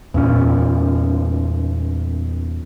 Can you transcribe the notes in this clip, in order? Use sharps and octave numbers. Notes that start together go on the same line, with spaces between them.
E2 A#2 C#4